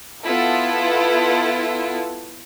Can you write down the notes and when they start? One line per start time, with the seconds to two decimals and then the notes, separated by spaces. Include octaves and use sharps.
0.26 B3 E4 F4 A4